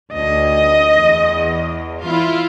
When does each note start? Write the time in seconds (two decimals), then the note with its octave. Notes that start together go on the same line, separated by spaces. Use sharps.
0.14 D2 D#5
0.95 E2
2.03 E4 F4